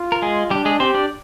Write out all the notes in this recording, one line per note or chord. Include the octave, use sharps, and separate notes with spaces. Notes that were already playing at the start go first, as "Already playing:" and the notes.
Already playing: F4
A#4
G#3 G#4
G3 D4 G4
G#3 G#4
C4 G4 C5
D4 D5